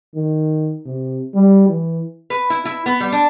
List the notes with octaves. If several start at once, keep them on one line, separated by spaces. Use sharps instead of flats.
D#3
C3
G3
E3
B4
E4
E4
B3
G3
D4